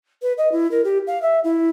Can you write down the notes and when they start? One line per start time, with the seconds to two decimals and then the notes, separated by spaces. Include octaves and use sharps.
0.22 B4
0.38 D#5
0.52 E4
0.71 A#4
0.84 G4
1.07 F5
1.22 E5
1.44 E4